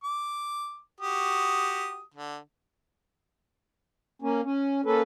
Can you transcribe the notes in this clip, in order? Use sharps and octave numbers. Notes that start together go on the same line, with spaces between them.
D6
F#4 G4 D#6
D3
A#3 C#4
C#4
A#3 C#4 A4 B4